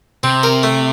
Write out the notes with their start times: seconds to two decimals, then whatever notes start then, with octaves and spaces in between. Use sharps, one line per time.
0.23 C3 C4
0.43 A#4
0.63 A3